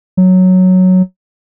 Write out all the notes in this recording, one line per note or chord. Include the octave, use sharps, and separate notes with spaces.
F#3